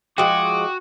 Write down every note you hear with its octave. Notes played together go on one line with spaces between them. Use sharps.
F3 G#3 F#4 G5 D6